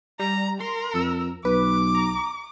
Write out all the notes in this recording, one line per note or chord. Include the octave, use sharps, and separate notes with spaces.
G3 A#5
A#4 C6
F2 E6
B1 B4 D6
A#5